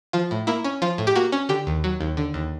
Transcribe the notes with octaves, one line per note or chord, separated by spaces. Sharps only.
F3 F4
A2
A#3 E4
C#4
F3 F4
A2
G4
A#3 F#4
C#4
D3 G4
D#2
F#3
D#2
D3
D#2